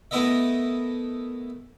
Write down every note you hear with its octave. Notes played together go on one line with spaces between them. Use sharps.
A3 B3 E4 A#4 D#5 E5